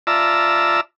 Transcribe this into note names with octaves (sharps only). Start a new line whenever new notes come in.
F4 D5 E5 A5 A#5 E6